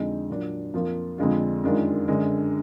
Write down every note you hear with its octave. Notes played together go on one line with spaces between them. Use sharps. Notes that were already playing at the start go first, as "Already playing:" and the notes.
Already playing: F2 D3 G#3 D#4
A#2 F#3 D4
F2 F3 A#3 F4
F2 D3 G#3 D4 F4
F#2 D#3 G#3 D4 F4
F#2 D3 G#3 D4